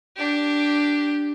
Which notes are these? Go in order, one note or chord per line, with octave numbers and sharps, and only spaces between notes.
D4 G4